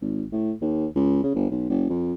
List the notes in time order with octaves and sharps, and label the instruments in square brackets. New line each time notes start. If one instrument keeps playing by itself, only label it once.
[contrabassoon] G#1
A2
D#2
C#2
C#3
G1
B1
F#1
F2